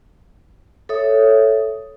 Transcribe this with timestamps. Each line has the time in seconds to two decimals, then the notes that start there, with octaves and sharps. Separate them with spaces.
0.89 A4 C#5 E5 D#6